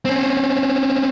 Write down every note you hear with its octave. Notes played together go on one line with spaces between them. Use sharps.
C4 C#4